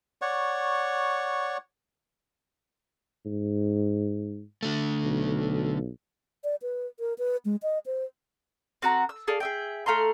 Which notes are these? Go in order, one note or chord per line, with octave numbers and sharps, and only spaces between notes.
C#5 D5 F#5 C#6
G#2
D3 A3
B1
D5
B4
A#4
B4
G#3
D#5
C5
C4 F#4 A#5
E6
G#4 A4 D5 F5
G#4 E5 G5
A3 F5 A#5 C6